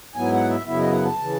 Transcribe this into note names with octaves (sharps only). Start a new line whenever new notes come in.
G#2 F#3 B3 E4 G#5
F#5
E5
F#2 C#3 F#3 B3 E4 E5
D#5
F#5
A5
C#3 E3